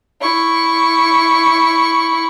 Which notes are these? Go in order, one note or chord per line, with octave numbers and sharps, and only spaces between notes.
E4 C#6